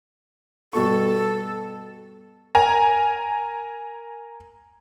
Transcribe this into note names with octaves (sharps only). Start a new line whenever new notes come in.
G2 B2 A4 C#6
A#4 G#5 A#5